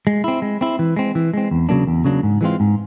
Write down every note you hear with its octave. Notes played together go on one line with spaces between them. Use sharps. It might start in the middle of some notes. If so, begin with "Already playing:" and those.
G#3
C4 E4
G#3
C4 E4
E3
G#3 C4
E3
G#3 C4
E2
C#3 F#3 A#3 D4
E2
C#3 F#3 A#3 D4
G#2
E3 G#3 C4 F4
G#2